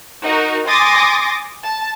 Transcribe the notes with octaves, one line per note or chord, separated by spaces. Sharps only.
D#4 F#4 A#4
G#5 C6 D6 D#6 A6 A#6
A5